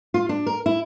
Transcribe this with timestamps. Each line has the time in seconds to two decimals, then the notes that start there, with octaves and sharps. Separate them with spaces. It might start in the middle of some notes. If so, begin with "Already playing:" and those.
0.14 F4
0.29 D4
0.46 A#4
0.66 E4